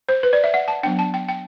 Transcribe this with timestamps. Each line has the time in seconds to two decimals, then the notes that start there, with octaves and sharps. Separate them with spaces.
0.09 C5
0.23 B4
0.33 D5
0.44 E5
0.54 F#5
0.68 A5
0.83 F#3 B3 D4 G5
0.99 A5
1.14 G5
1.28 G5